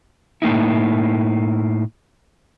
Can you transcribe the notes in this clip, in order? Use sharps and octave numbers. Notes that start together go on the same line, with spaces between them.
A2 A#3 D#4 E4